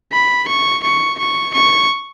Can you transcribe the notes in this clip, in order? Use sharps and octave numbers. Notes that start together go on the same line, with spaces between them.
B5
C#6
C#6
C#6
C#6